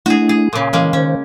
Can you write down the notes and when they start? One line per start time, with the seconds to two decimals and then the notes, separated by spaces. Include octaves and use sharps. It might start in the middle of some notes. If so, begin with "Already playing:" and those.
0.06 A3 D4 E4 F#4 G#4
0.29 G#4
0.53 A#2 C#3 G#5 C6 D6
0.73 E3 G#3 A#3 C#4
0.93 D#3 C#4 C5